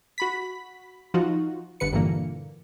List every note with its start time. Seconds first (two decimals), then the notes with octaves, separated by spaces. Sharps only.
0.18 F#4 B5 B6
1.14 F3 D#4 F4 F#4
1.80 G1 D3 B4 C#7
1.93 G2 A#2 D3 E3 A#3